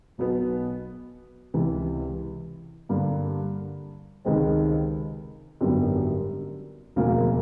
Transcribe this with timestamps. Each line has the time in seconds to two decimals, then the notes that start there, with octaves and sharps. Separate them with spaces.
0.18 B1 B2 F#3 B3
1.54 C#2 C3 E3
2.89 G2 D3 G3 A#3
4.25 C#2 C3 D#3 G#3 C4
5.61 G#1 F#2 D3 G3 B3
6.96 E1 D2 C#3 F3 A#3